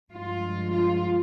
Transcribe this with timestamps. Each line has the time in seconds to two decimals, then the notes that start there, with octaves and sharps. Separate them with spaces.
0.12 G2 F3 G#3 F4
0.72 F4